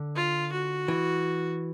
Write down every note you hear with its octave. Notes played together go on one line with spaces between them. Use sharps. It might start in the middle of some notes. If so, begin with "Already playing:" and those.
Already playing: D3
F4
F#4
E3